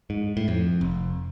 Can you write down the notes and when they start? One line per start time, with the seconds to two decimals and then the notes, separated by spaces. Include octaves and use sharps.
0.10 G#2
0.37 A2
0.48 F2
0.81 F1